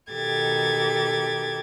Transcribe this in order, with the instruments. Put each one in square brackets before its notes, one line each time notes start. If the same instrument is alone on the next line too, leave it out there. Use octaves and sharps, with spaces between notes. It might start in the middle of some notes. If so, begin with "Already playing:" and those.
[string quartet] B2 D#3 G4 A4 G#6 A6